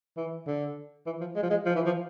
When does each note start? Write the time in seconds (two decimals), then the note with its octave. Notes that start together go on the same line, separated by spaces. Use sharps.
0.17 E3
0.47 D3
1.06 E3
1.21 F3
1.36 G#3
1.43 F3
1.50 G#3
1.66 F3
1.75 E3
1.86 F3